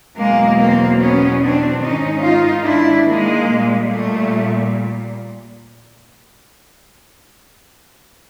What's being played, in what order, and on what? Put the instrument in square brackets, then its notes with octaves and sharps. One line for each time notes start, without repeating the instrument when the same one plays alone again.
[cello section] E2 B2 F#3 G#3 A#3
A#3 C4
B3 C#4
C4 D4
G#2 D#3 G#3 C#4 D#4
D#4 F4
D4 E4
G#3 A#3
A#2 G3
A3